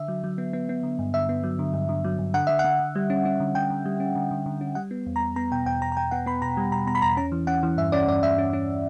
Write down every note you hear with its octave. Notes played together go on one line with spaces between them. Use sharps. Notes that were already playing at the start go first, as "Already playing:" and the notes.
Already playing: D3 E5
F#3
F#3
B3
B3
B3
D3
G2
D3 E5
B3
F#3
D3
G2
D3
F#3
G2
D3 F#5
D3 E5
F#5
D3
D3
G3
C#4
C#4
D3
D3 G5
D3
G3
C#4
D3
D3
D3
C#4
G3 F#5
B3
E2
A#5
E2
B3 A#5
B2 G5
E2 G5
E2 A#5
A#5
B2 G5
B3 F#5
B3 B5
B2 A#5
G3
B2 A#5
B2 A#5
B5
E2 A#5
C#4 A#5
E3
C#4 F#5
E3
G2 E5
C#4 D5
G2 D5
G2 E5
C#4
C#4